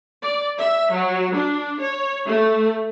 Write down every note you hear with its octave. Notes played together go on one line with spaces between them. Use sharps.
D5
E5
F#3
D4
C#5
A3